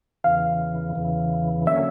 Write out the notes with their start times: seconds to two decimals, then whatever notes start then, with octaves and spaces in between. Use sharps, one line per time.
0.24 E2 C#3 E3 F5
0.95 E2 C#3 E3
1.66 D3 F#3 A#3 C#4 E5